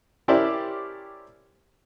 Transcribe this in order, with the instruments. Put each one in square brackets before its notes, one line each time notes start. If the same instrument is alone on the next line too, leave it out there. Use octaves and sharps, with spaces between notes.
[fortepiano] C#4 E4 G4 A#4 C5 D5